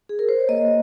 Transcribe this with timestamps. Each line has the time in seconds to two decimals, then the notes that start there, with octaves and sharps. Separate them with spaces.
0.09 G#4
0.19 A#4
0.29 C5
0.39 C#5
0.49 A#3 D#5